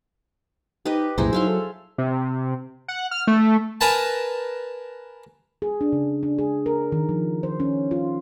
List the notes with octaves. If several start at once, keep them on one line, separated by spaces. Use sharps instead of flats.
D#4 G4 B4 D#5
C2 F#2 A#2 E4 G#4 C5 A#5
F#3 D#4 E5 F5 C6
A4
C3
F#5
F6
A3
A#4 B4 G#5 A5
G#4
D4
C#3
D4
G#4
A#4
D#3
F3
C5
C#4
F4